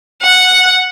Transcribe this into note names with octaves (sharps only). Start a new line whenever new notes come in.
F#5